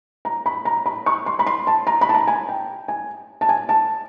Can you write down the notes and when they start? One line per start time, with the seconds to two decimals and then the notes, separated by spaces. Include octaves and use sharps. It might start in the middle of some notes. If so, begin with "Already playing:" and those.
0.25 A#5
0.46 B5
0.65 A#5
0.86 B5
1.06 C#6
1.26 C6
1.39 B5
1.47 C6
1.67 A5
1.87 A#5
2.01 B5
2.09 A5
2.14 A#5
2.27 G#5
2.49 G5
2.88 G#5
3.41 A5
3.49 G#5
3.69 A5